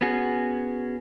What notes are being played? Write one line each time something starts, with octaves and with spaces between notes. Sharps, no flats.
B3 C#4 F#4 G#4